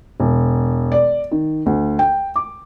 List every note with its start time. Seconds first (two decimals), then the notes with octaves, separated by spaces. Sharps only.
0.20 E1
0.92 D5
1.31 D#3
1.66 D2
1.99 G5
2.36 D6